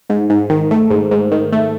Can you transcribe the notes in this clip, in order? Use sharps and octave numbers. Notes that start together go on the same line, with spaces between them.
G#2
G#2
D#3
A3
G#2
G#2
D#3
A3